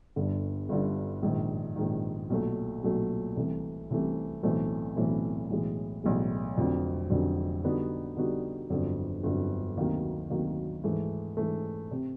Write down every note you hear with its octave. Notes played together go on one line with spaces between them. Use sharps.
G1 G2 D3
G1 G2 D3
A#1 G#2 D#3
A#1 G#2 D#3
B1 A#2 F#3 A3
B1 A#2 F#3 A3
C2 C3 E3 A3
C2 C3 E3 A3
B1 A2 E3 A3 C4
B1 A2 E3 A3 C4
B1 A2 E3 G#3
B1 A2 E3 G#3
F1 F2 D3 F#3
F1 F2 D3 F#3
D3 G3 B3 D#4 F#4
D3 G3 B3 D#4 F#4
G1 F2 D3 F#3
G1 F2 D3 F#3
D2 C3 D#3 F#3 A#3
D2 C3 D#3 F#3 A#3
G#2 E3 A3
G#2 E3 A3
C3